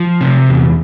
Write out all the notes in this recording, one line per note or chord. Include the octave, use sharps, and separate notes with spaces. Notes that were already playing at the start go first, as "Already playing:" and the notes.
Already playing: F3
C3
E2